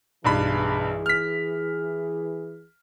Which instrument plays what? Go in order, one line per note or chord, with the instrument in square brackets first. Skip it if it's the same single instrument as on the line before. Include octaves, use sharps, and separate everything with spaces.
[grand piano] B1 G2 B5 [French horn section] E3 G#4
[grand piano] F6 B6